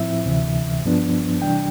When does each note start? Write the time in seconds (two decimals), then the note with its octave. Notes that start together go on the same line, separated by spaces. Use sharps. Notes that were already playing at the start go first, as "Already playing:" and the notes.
Already playing: A2 F3 C4 E4 E5
0.26 D2 C3 E3
0.84 G2 F3 B3 D4
1.42 C3 E3 G3 D4 G5